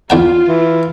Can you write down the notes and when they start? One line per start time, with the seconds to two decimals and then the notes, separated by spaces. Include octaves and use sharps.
0.10 E2 F4 G5 G#5
0.47 E3